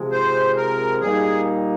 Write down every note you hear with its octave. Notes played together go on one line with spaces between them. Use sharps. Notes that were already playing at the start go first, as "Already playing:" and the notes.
Already playing: C3 F3 G#3 C4
C5
A#4
A#2 G3 A#3 D#4 G#4